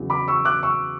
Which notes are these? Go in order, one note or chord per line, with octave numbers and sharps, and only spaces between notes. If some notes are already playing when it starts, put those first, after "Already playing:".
Already playing: E2 C#3 F#3
B5 D6
C#6 E6
D6 F#6
C#6 E6